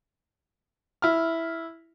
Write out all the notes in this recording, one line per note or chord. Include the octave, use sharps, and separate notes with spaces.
E4 F6